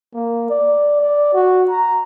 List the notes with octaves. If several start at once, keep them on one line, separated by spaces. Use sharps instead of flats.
A#3
D5
D5
F#4
A#5